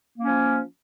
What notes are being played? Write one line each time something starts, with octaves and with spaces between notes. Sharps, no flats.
F3 A#3 C#4